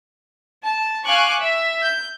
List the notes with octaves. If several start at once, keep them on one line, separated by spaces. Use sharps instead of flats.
A5
F5 G#5 C#6 D6 F#6
E5
G6